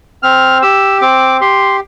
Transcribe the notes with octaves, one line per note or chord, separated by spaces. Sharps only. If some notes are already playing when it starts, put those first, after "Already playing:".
C4 F6
G4 E6
C4 D6
G4 C6